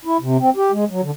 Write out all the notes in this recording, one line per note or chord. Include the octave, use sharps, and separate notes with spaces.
E4
C3
C4
G4
G#3
F#3
D3